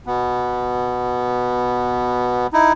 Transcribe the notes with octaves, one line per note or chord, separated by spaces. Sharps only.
B2 B3
D#4 E4